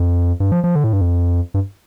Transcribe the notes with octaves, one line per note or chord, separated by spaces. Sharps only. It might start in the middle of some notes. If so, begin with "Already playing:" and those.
Already playing: F2
G2
F3
F3
D3
A2
G2
F2
G2